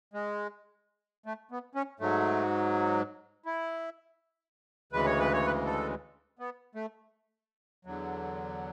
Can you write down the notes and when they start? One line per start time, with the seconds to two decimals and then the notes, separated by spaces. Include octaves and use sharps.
0.14 G#3
1.26 A3
1.51 B3
1.75 C#4
2.00 G#2 F#3 A3
3.46 E4
4.92 D2 C#3 E3 G#3 B4
5.06 C#5
5.19 B4
5.33 C#5
5.46 B4
5.66 A4
6.39 B3
6.75 A3
7.85 E2 D3 F#3